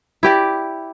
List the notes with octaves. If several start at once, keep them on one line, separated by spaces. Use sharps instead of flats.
E4 G4 D5